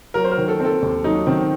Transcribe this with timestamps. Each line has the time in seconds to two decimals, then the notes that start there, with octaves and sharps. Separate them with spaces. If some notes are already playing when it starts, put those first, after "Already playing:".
0.14 F#3 A#4
0.24 C5
0.31 A#4
0.37 D#3
0.48 A4
0.60 C4
0.65 A4
0.82 D#2
1.04 F#3 D#4
1.27 D#3 C4